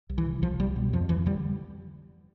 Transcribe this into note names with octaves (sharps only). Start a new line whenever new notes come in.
C2
E3
C3
C2 F3
C2 G3
B2
F2 F3
F2 E3
D3 G3